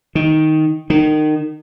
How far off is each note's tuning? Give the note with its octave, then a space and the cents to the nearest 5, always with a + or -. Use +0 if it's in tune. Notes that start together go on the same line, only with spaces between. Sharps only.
D#3 +5
D#3 -25